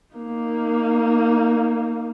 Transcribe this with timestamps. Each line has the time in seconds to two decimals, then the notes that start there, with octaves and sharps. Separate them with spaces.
0.14 A#3 D#4